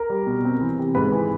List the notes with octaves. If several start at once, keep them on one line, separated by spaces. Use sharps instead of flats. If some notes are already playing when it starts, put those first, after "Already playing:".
Already playing: A#4 A#5
G3
B2
C4
E3
C3
G#2 B4 B5
E3